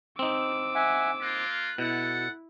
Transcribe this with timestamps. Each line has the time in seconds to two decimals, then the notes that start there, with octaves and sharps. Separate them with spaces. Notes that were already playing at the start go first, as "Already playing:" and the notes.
0.19 C4 D#4 D6 E6
0.75 E5 F#5 G#5
1.22 A#3 F4 F#6
1.78 B2 E4 A4 F#5